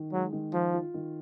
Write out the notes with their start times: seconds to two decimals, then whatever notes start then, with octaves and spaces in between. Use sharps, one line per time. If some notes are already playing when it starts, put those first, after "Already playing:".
Already playing: D#3
0.12 F#3 G#3
0.33 D#3
0.53 F3 F4
0.73 F4
0.94 D#3